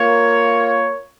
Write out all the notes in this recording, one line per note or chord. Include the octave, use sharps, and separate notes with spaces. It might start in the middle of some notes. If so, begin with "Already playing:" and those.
Already playing: A#3 F4 A#4 C#5